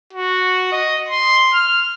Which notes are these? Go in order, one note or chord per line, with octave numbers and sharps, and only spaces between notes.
F#4
D#5
C6
F6